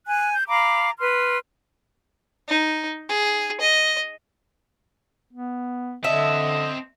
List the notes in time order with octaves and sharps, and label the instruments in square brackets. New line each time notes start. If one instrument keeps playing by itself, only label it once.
[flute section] G#5 F#6
G6
F5 A#5 B5 D6
B4 C6 F6
[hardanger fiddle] D#4
G#4
D#5
[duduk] B3
[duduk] D3 [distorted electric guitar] C4 A5 [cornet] D#5 [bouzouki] E5